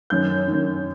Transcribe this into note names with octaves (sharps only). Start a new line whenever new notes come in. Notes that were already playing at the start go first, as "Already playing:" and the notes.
F#2 D#3 G6
F#2 D#3